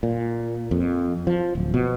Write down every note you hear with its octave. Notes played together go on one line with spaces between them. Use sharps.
A#2
F2
F3
D1
B2